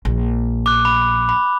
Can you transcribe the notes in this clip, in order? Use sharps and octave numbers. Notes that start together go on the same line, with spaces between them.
A#1
D6 F#6
B5
B5